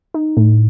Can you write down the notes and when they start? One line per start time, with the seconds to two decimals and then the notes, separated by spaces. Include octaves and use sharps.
0.14 D#4
0.37 A2